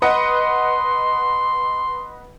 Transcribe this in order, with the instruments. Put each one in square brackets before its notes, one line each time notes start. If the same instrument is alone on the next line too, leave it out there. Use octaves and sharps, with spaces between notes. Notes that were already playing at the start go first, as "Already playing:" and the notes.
[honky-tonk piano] B4 D#5 F#5 [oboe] C6